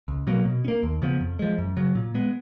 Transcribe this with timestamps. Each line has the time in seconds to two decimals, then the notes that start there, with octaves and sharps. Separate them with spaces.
0.08 C#2
0.27 B2 F#3 A#3
0.45 B2
0.65 C#4
0.68 A#3
0.83 D#2
1.02 C#3 F3 B3
1.21 F2
1.39 F3 G#3
1.58 F#2
1.77 C#3 F#3
1.95 A#2
2.15 G#3 B3